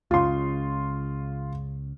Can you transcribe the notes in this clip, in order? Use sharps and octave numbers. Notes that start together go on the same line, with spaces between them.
C#2 C#3 F4 C6